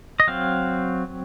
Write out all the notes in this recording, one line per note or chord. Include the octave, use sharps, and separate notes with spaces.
D#5
F#3 C4 F5